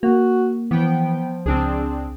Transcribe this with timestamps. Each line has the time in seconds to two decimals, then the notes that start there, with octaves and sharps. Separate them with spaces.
0.03 A#3 F#4
0.71 E3 F3 B3 G5
1.46 C#2 C4 D4 G#4